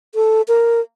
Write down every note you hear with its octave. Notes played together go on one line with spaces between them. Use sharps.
A4
A#4